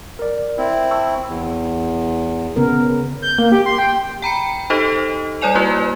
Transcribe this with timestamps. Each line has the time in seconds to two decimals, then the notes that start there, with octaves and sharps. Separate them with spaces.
0.19 A#4 D5
0.58 C4 E4
0.91 A5 C#6 E6
1.28 E2
2.56 C#3 B3 A#4
3.22 G6
3.38 A#3
3.52 G4
3.66 C6
3.78 G5
4.22 G5 A#5 B5 C#7
4.70 D#4 G4 A4 C5 D#5
5.41 G3 C#5 D5 G#5 F7
5.55 A#3 E4 F#4 B4